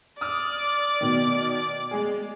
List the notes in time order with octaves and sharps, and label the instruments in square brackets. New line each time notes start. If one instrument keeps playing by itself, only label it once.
[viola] D5 [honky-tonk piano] D#6 F6
[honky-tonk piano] B2 D#3
G#3 G#4